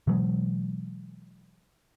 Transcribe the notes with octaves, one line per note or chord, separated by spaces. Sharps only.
B2 E3 F#3 G#3